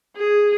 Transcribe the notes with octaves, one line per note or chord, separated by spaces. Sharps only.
G#4